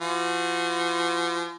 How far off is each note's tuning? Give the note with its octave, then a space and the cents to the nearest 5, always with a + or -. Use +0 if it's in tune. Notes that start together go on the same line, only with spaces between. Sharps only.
F3 -40 F#4 -35